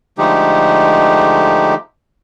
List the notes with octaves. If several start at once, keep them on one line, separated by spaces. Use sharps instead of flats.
D3 F3 G#3 A3 D#4 G4